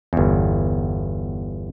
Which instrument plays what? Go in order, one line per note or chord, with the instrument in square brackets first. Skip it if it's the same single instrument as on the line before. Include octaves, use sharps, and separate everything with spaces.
[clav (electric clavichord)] G1 E2